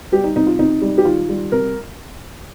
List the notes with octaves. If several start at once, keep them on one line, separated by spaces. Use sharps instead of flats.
G3 G4
D#4
C3 D#4
F4
C3 D#4
G3
G4
D#3 F4
G3
C3 A#4